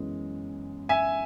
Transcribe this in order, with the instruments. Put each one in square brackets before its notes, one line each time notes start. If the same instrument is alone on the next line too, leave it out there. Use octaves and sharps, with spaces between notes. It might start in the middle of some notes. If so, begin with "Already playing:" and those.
Already playing: [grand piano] F#2 E3 G#3 B3
E5 G#5